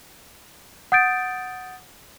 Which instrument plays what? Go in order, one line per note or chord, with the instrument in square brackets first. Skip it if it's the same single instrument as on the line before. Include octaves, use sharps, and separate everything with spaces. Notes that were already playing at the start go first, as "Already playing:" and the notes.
[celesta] F#5 D#6 G6 A6 D7